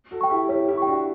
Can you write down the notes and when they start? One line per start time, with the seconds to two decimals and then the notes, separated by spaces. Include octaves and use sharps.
0.11 F#4 A4
0.21 G5 C#6
0.30 E4 G4
0.49 E4 G4 C#5
0.68 E4 G4
0.77 G5 C#6
0.87 D4 F#4